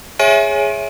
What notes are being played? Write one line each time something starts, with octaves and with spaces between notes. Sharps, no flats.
G#4 C#5 E5 G#5 D7 D#7